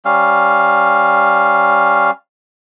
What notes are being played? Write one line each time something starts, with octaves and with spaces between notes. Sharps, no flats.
G3 C#4 F5